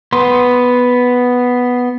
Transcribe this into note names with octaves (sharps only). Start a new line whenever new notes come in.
B3 C6